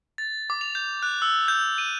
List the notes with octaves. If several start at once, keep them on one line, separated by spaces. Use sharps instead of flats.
A6
D6
F7
G6
F#6
E6
G6
D#7